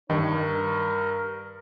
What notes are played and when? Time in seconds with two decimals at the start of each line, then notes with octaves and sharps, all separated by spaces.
0.10 G2 D#3 D#4 C#5
0.32 A#4